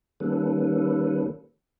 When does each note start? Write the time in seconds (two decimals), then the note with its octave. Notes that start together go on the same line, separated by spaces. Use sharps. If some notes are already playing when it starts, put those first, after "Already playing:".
0.20 D#3 G3 A#3 C#4 A4 B4